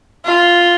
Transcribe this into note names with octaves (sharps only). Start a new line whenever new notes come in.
F4